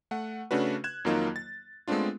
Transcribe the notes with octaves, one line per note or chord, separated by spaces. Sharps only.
A3 F#5
C#3 A3 C#4 D4 F#4 B4
F#6 G#6 E7
F2 D#3 F#3 A#3 D#4 F4
A6
G#3 A3 B3 C4 D4 F4